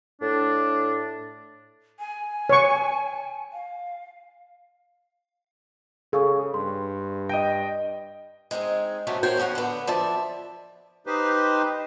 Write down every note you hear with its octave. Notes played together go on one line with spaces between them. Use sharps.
A2 D4
G#5
C#5 C#6
F5
C#3 G#4 A4 F5 C#6
G2 C6
D#5 G5 A#6 D#7
G#3 C4 D#4 G#4
F#2 C3 F#3 A3 A#3 C#4
F#4 A#4 C5 C#5 G5
E2 A2 C#4 F#4 F#5
D3 B3
F3 D5 E5 A5
D#4 G4 B4 C5